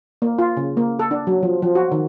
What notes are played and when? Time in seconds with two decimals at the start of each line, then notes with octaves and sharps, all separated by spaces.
0.22 A#3
0.39 F4
0.57 C#3
0.77 A#3
0.99 A4
1.11 D4
1.27 F#3
1.43 F3
1.62 F3
1.75 F#4
1.92 D#3